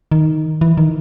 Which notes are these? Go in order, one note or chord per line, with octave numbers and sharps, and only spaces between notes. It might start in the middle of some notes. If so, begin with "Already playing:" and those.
D#3
E3
D#3